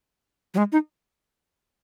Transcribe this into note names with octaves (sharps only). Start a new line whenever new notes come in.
F#3
G#3
D#4